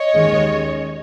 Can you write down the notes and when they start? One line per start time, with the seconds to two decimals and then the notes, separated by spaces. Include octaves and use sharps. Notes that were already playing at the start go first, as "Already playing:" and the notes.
Already playing: C#5 D#5
0.13 D#2 D#3 G#3 C#4